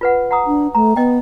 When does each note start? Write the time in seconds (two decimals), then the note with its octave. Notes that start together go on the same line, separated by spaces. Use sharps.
0.01 F4 B4 F#5
0.31 F#5 A#5 D#6
0.47 D4
0.75 A3 A#5
0.96 B3 D#5 G5